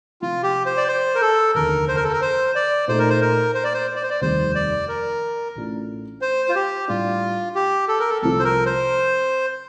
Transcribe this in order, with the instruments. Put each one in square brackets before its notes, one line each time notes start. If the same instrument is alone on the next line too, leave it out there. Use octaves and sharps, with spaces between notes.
[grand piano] C3 F3 C4 [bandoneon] F4
[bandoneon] G4
C5
D5
C5
A#4
A4
[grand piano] F1 D#2 D3 [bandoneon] A#4
[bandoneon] C5
A#4
A4
A#4
C5
D5
[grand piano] A#2 A3 D#4 [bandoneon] C5
[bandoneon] A#4
C5
A#4
C5
D5
C5
D5
C5
D5
[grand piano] F1 D#2 D#3 G3 [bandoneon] C5
[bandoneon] D5
A#4
[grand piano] A1 A2 A3 D4 F4
[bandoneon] C5
F4
G4
[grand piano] A2 G3 D4 [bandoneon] F4
[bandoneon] G4
A4
A#4
A4
[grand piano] C2 C3 F3 [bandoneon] A4
[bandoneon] C5
A#4
C5